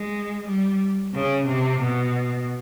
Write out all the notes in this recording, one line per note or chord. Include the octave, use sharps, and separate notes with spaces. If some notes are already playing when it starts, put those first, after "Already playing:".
Already playing: G#3
G3
C#3
C3
B2